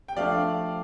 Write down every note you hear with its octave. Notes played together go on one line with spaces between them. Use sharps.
G5
F3 A3 D4 D5 F5